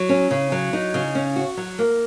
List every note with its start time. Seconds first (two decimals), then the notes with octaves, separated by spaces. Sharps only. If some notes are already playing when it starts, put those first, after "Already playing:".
Already playing: F#3
0.09 C#4
0.31 C#3
0.52 F#3
0.73 D#4
0.94 C#3
1.15 C#4
1.36 F#4
1.57 F#3
1.79 A#3